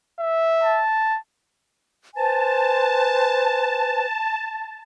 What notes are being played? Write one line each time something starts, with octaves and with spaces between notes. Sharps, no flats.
E5
A5
B4 C5 G#5 A5